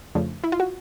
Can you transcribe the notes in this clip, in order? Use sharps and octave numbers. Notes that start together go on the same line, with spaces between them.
F2 C#3 F3 A3 D4
E4
F4
F#4